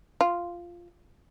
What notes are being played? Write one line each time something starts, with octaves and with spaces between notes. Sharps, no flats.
F4